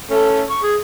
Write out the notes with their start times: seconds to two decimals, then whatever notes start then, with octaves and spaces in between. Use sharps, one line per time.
0.10 A3 C#4 A4
0.50 C#6
0.62 G#4